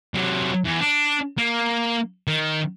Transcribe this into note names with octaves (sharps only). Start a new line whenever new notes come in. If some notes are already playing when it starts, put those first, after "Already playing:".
C3 F#3
E2
D4
A#3
D#3